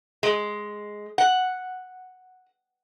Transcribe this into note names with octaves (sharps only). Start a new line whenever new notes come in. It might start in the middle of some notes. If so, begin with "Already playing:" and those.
G#3
F#5